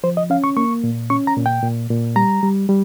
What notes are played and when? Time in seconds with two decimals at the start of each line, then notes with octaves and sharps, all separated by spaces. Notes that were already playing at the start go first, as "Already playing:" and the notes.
0.03 F3 C5
0.17 D#5
0.30 C#4 F5
0.44 C#6
0.57 A#3 C#6
0.84 A#2
1.10 C#4 C#6
1.27 A#5
1.37 A#2
1.46 G5
1.63 A#2
1.90 A#2
2.16 G3 A#5
2.43 G3
2.69 G3